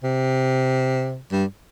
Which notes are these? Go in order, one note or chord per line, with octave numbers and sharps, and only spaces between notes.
C3
G2